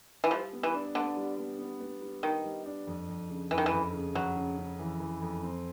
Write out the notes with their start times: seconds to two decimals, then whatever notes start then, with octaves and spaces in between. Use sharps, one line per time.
0.24 E3
0.31 F3 G3
0.53 B3
0.63 E3
0.74 D4
0.95 D3 B3
1.17 G3
1.38 B3
1.59 B3
1.81 B3
2.02 G3
2.23 D#3 G3
2.44 G3
2.66 D4
2.87 F2
3.08 F2
3.30 C#3
3.51 F2 E3
3.58 D#3
3.66 E3
3.72 F2
3.93 C#3
4.15 F2 F#3
4.36 C#3
4.58 C#3
4.79 E3
5.00 E3
5.21 F2
5.43 C4